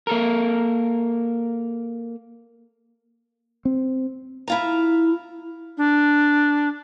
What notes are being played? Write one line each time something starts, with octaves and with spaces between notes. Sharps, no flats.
A#3 A4 A#4
C4
E4 F4 A#5
D4